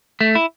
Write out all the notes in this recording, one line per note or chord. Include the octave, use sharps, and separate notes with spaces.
A3
E4